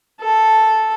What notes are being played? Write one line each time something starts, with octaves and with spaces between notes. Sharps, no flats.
A4